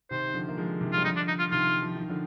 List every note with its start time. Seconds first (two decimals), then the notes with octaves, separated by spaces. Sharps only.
0.11 C3 D#3 C5
0.28 D#3
0.34 D3 F3
0.49 A#3
0.57 F3 G#3
0.81 C3 D#3
0.93 G3 F4
1.04 D3 F3 D#4
1.16 D4
1.28 D#4
1.39 F4
1.51 C3 D#3 F4
1.82 F3
1.96 D#3
2.09 D3 F3